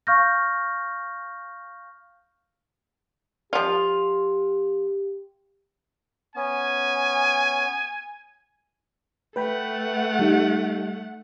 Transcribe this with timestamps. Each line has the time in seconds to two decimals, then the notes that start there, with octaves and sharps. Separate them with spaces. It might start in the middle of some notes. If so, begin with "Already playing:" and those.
0.07 F5 C#6 F6 G6 A#6
3.53 F3 F4 G4
6.36 B3 C#4 G#5
9.36 A3 B4 F#5 G5 B5
10.19 G3 D#4